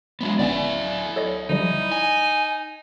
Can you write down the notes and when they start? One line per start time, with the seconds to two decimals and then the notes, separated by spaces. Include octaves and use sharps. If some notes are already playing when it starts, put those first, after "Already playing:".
0.21 F#3 G#3 B3
0.39 G1 B3 C#4 E4 D5
1.16 A4 C#5 D#5
1.49 D3 F3 G3 D#4
1.92 G#5